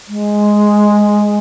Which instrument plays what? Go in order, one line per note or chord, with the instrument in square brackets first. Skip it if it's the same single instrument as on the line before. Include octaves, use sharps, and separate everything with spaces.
[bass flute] G#3